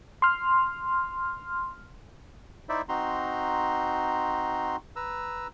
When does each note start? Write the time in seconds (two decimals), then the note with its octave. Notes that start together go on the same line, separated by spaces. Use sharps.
0.22 C6 F6
2.69 D#4 E4 C5 D5 E5
2.89 C4 D#4 F#4 A#5 C6
4.96 B4 A#5 E6